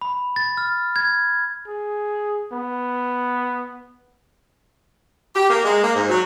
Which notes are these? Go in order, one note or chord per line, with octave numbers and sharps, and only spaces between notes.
B5
A6
F6
G#6
G#4
B3
G4
A#3
G#3
A#3
G#2
F#3